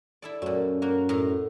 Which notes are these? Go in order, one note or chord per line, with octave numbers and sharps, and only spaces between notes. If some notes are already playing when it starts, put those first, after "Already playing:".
E4 A4 D5
F#2 A#2 A3
A#3 F#4
A2 A#5